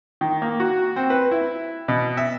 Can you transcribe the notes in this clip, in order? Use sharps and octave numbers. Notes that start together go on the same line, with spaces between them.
D#3
A#3
F#4
C4
B4
E4
B2
E5